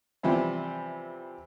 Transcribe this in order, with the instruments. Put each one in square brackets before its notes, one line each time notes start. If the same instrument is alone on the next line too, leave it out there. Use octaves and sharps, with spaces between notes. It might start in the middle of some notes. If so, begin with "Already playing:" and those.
[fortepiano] C3 E3 F3 G3 C4